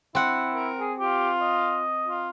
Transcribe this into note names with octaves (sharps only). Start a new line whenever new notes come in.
C4 E4 F#5
A#4
G#4
F4 G4
D#5
F4